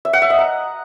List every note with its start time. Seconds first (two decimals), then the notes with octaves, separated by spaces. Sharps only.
0.05 E5
0.13 F#5
0.22 E5
0.30 D#5
0.39 A#5